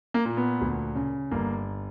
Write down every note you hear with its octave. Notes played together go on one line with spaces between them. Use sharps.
A#3
A#2
B3
D2
C#3
G1 A#3